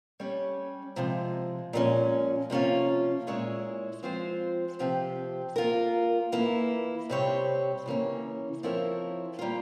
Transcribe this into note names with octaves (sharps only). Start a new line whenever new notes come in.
G3 C#4 G4 C#5
C3 F3 G#3
A#2 F3 G#3 C#4
C3 F3 A#3 C#4 F4
A#2 G#3 E4 G#4 C#5
F3 G#3 C4 F4 C5
C3 F3 C4 G4
A#3 F4 A#4
E3 A#3 E4
C3 G3 C4 G4 C#5
C#3 E3 A#3 C#4
F3 C4 E4 A#4 C#5
G3 A#3 F4